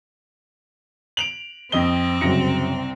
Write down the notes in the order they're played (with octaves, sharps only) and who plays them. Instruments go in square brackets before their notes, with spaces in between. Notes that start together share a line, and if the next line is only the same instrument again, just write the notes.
[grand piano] D7 F7 F#7
[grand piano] F2 D#5 G7 [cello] C4
[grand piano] C2 A#6 C#7 [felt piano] F#2 C#3 F#3